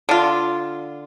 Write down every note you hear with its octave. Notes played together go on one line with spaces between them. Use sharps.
D3 F4